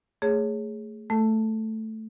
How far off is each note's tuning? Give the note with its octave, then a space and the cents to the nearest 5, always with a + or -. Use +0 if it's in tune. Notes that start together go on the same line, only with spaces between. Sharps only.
A3 +20 G#4 +0 C#5 +0
A3 +0 A4 +0